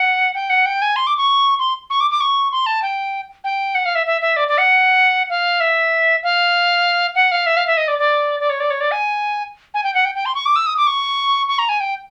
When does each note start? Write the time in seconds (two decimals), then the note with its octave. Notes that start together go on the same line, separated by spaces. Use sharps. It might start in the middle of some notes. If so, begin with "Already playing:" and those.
Already playing: F#5
0.35 G5
0.50 F#5
0.66 G5
0.82 G#5
0.96 C6
1.07 D6
1.17 C#6
1.59 C6
1.90 C#6
2.00 D6
2.11 D6
2.21 C#6
2.52 C6
2.66 A5
2.82 G5
3.44 G5
3.75 F#5
3.86 F5
3.95 E5
4.06 E5
4.21 E5
4.37 D5
4.48 D5
4.58 F#5
5.30 F5
5.60 E5
6.23 F5
7.15 F#5
7.32 F5
7.46 E5
7.57 F5
7.67 E5
7.77 D#5
7.88 D5
7.99 D5
8.40 D5
8.50 C#5
8.60 D5
8.70 C#5
8.81 D5
8.91 G#5
9.74 G#5
9.84 G5
9.95 F#5
10.05 G5
10.15 G5
10.26 C6
10.35 C#6
10.46 D6
10.56 E6
10.66 D#6
10.77 D6
10.87 C#6
11.48 C#6
11.59 A#5
11.69 G#5
11.80 G5